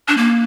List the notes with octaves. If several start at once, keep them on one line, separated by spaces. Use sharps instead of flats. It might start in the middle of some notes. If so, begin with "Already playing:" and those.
D4
A#3